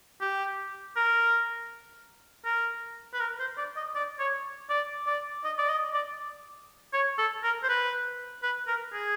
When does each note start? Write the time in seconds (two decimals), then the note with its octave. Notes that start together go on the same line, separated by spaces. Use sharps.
0.21 G4
0.96 A#4
2.45 A#4
3.13 B4
3.20 A#4
3.39 C5
3.58 D5
3.76 D#5
3.95 D5
4.19 C#5
4.70 D5
5.07 D5
5.44 D#5
5.58 D5
5.69 D#5
5.94 D5
6.93 C#5
7.18 A4
7.43 A#4
7.63 C5
7.69 B4
8.43 B4
8.67 A#4
8.93 G#4